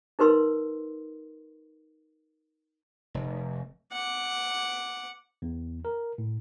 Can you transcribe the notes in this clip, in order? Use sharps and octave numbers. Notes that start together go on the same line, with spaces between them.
D#4 A#4 B4 C6 E6
F1
F#5 D6
E2
A#4
A2